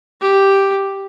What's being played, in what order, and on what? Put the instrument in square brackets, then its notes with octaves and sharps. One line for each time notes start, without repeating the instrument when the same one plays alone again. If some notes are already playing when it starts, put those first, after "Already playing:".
[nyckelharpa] G4